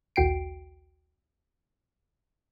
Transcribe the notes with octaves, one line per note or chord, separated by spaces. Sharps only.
A#1 D#2 F#4 G5 C7 D7